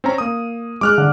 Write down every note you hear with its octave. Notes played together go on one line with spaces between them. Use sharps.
C4 C#4 A#5
A#3 D#6
G#3 D6 F6 F#6
D3